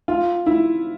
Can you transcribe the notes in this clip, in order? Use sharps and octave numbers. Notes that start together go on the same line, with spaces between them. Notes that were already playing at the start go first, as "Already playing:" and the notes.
F4
E4